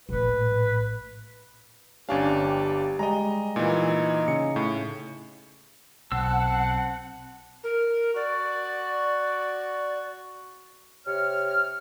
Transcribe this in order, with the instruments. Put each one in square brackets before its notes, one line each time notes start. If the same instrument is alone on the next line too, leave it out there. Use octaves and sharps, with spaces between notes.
[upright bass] A#1 A2 [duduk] B4
[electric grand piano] G1 D4 F5 [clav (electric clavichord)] C#4 [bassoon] G4
[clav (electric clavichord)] G5
[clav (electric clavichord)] G3 G#3 [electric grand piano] D#5 A#5
[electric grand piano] A#2 E3 [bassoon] D#4
[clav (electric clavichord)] C#3 [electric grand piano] C#7
[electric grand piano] A2
[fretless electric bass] B1 [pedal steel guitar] C4 E6 [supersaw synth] F#5 [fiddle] A5
[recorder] A#4
[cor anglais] F#4 [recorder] D5
[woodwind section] C3 C#5 F6